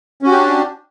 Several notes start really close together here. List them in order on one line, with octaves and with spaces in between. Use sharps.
C#4 F#4 G4 D4